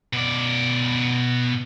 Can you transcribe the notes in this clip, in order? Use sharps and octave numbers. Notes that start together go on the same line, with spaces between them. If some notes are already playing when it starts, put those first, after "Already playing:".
B2 D5